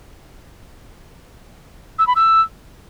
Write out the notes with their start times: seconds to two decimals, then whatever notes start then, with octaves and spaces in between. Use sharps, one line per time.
1.99 E6
2.07 B5
2.16 E6